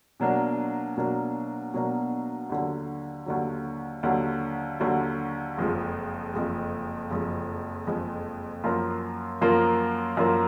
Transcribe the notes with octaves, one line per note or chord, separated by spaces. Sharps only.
B2 F#3 A#3 D4
B2 F#3 A#3 D4
B2 F#3 A#3 D4
D#2 D3 F#3
D#2 D3 F#3
D#2 D3 F#3
D#2 D3 F#3
F#1 F2 F3 G#3
F#1 F2 F3 G#3
F#1 F2 F3 G#3
F#1 F2 F3 G#3
F#2 F3 A#3 F4 A#4
F#2 F3 A#3 F4 A#4
F#2 F3 A#3 F4 A#4